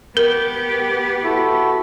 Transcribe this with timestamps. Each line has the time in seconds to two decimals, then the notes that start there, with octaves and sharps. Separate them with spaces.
0.17 B3 G4 A#4
1.24 E4 F#4 A4